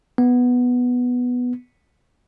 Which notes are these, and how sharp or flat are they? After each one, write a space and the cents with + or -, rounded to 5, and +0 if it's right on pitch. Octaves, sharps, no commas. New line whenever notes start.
B3 +0